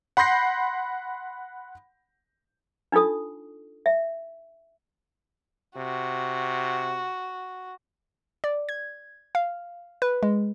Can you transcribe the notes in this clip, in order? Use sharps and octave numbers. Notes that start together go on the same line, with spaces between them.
F#5 B5 C6 G6 A#6 C7
D4 D#4 F4 A4 D#6
E5
C3 F#4
D5
G#6
F5
B4
G#3